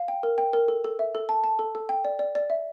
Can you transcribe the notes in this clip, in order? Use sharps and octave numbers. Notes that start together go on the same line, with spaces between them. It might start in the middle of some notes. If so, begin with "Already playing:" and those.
Already playing: F5
G5
A#4
G5
A#4
A4
A4
E5
A4
A5
A5
A4
A4
G5
D5
D5
D5
E5